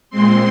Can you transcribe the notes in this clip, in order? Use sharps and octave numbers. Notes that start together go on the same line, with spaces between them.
A#2 G#3 C4 C6